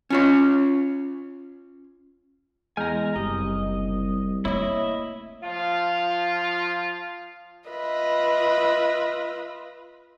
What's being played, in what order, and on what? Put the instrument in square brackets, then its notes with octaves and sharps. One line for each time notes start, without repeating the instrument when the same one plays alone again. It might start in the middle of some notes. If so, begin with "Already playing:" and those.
[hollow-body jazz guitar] C#4 F4 C#5
[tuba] E2 [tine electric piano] G#3 F6 G6 [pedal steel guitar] G#5 A#5
[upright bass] F#1 [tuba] C2 [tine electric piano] G4 [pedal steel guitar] D#5
[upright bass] A3 A#3 [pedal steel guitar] E4 D#5 E5 [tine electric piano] C#5
[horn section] F3 F4
[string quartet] F4 B4 D#5 E5